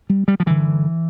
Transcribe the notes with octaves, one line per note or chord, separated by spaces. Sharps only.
G3
G3
F3
G2 D3 E3